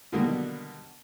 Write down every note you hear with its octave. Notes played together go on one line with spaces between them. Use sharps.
B2 D3 D#3 F#3 G3 A#3